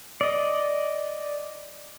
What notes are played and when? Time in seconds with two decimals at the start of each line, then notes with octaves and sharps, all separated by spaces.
0.21 D5 D#5